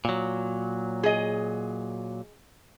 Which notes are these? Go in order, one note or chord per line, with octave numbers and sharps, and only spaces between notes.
A#2 F#3
G#4 D#5